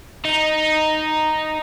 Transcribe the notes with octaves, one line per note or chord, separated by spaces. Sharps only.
D#4